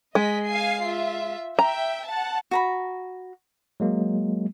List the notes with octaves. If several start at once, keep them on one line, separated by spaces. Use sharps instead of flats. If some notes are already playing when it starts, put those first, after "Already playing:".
G#3 D#5 B6
F5 G#5 C7
F4 E5
E5 G5 A#5
F#5 A5
F#4 A#5 B5
F#3 G#3 A#3